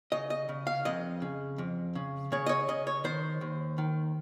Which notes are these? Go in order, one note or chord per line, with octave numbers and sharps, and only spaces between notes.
C#3 D#5
D#5
C#3
F5
F2 D#5
C#3
F2
C#3
C#3 C#5
D#5
C#5
C#3 D#5
C#5
D#3 C5
D#2
D#3